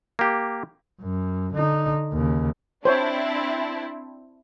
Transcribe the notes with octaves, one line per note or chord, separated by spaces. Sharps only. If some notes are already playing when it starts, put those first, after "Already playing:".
A#3 G4
F#2
D3 D#4
D#2 C#3
C4 D4 E4 C5 C#5